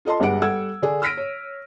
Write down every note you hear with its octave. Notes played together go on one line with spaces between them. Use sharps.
F4 A4 D#5 A5 C6
G1 G2 G#3 G4 F#5 D7
G3 A4 F#5 E6 G#6
D3 D4 G#4
E6 F6 A#6 B6 D7 D#7
C#5